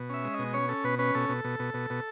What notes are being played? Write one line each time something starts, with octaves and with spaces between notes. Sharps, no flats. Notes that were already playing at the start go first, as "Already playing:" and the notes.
Already playing: B2
C#4 E5
G#3
B2 D#5
C#4 C#5
C#4 A4
B2 B4
C#4 B4
B2 A4
B2
B2
B2
B2
B2